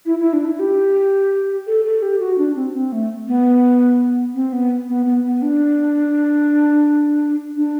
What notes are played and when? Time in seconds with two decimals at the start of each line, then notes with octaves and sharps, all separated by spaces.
0.06 E4
0.19 E4
0.33 D4
0.45 E4
0.59 G4
1.67 A4
1.85 A4
2.02 G4
2.20 F#4
2.38 D4
2.56 C4
2.74 C4
2.92 A3
3.28 B3
4.34 C4
4.53 B3
4.89 B3
5.06 B3
5.24 B3
5.42 D4
7.56 D4